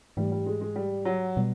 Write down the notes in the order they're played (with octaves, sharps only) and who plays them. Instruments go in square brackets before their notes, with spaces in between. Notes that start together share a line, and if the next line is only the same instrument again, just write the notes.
[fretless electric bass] G#2 E3 A3 [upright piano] G3
[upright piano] G3
G#3
G#3
G3
F#3
[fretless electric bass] B2 G3